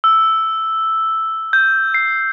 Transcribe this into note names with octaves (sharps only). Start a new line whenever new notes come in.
E6
G6
C7